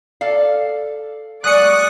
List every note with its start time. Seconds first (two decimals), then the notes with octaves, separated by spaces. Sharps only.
0.21 A4 D5 F5
1.44 F#3 G#3 D5 C#6 D#6 F#6 C#7